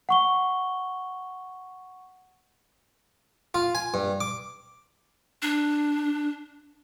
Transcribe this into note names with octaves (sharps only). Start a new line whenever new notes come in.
F#5 C#6 G7
F4
G#5
G2
D6
D4